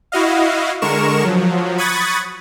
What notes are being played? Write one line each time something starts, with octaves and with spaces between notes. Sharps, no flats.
E4 F#4 D#5 F5
D3 G#3 A#4 C#6 E7
F3 F#3
B5 C#6 D#6 F#6 G#6 A6